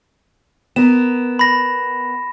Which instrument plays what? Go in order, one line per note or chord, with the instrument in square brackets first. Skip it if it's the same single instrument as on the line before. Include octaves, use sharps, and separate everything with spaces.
[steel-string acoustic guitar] B3 A#4 [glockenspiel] E7
[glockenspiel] B5 A#6